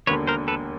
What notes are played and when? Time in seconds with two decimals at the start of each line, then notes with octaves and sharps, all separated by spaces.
0.07 E1 D#2 D3 B4 C#5
0.27 A#4 C5
0.48 A4 B4